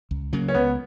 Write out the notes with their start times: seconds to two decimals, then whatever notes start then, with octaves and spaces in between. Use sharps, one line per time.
0.11 C#2
0.33 C#3 F#3 A#3
0.48 C#4
0.54 C#2 B3